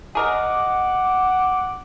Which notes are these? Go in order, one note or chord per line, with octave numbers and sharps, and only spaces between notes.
G#4 A#4 D#5 F#5 D6